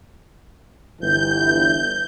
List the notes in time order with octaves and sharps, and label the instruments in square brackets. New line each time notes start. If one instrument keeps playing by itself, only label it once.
[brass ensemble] G1 E3 [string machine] G6